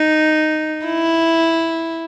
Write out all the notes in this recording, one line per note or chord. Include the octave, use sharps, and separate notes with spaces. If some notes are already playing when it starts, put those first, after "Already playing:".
Already playing: D#4
E4